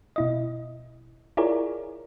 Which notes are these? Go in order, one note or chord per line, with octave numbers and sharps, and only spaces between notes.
B2 E4 D#5
E4 F4 G#4 A#4 C#5 D5